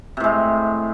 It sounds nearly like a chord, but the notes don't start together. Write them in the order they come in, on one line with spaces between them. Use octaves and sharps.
C3 A2 G#3